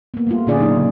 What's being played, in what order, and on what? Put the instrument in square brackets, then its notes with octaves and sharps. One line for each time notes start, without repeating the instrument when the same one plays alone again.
[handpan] A#3 B3
G3 A3 F4
A#2 D3 C#4 F4 G#4 D5
F#3 D#4 F4
C#3